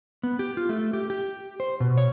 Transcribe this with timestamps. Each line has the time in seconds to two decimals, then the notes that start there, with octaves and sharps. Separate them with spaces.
0.23 B3
0.39 G4
0.57 F4
0.69 A3
0.93 G4
1.10 G4
1.60 C5
1.80 B2
1.98 C#5